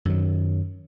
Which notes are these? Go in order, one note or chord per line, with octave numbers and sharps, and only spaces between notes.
F#2 D#3 F#3